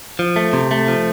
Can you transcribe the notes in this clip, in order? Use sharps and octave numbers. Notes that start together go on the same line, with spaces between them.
F3
A3
C3
A3
F3